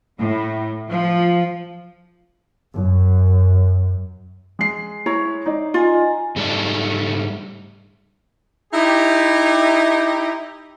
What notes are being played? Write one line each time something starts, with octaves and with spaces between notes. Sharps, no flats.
A2
F3
F#2
G#3 C7
E4 C#5 A#5
D#4 D5
F4 D#5 G#5 A#5
G#2 G3 A3 D#4 D5 A5
D#4 E4 G4